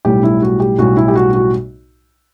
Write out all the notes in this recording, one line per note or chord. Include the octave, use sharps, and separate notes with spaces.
B1 A2 G3 G4
E4
F#4
G4
B1 A2 G3 F#4
E4
G4
F#4
F#4